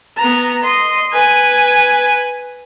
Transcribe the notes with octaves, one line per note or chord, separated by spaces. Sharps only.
B3 A#5
D#5 C6
B4 G#5